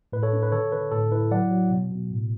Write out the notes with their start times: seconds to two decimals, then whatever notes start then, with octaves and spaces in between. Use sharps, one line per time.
0.13 A2 B4
0.23 A4 C#5
0.33 D4
0.43 B4
0.52 D3 A4 C#5
0.72 D3 B4
0.91 A2 A4
1.12 E4 B4
1.31 F#3 D5 F#5
1.51 F#3
1.70 B2
1.91 B2
2.11 A2